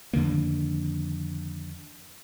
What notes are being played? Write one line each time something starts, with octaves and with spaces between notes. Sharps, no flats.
F2 D3 D#3 A#3